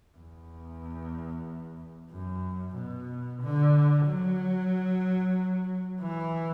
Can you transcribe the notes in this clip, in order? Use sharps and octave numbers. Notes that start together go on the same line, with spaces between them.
E2
F#2
B2
D3
F#3
E3